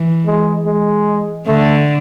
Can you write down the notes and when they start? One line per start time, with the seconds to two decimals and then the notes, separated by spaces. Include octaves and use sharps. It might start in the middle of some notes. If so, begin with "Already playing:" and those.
Already playing: E3
0.26 G#3
0.66 G#3
1.47 D3 A3